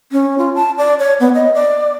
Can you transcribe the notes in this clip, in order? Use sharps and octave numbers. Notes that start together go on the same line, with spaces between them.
C#4
F4
A5
D5
C#5
B3
D#5
D5